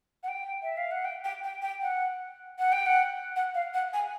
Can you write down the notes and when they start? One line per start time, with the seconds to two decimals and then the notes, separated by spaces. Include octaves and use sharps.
0.23 F#5
0.28 G5
0.63 E5
0.77 F5
0.91 F#5
1.05 G5
1.24 G5
1.44 G5
1.62 G5
1.82 F#5
2.59 F#5
2.72 G5
2.86 F#5
3.36 F#5
3.55 F5
3.74 F#5
3.93 G#5